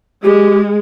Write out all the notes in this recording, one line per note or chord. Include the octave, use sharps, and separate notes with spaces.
G#3 G4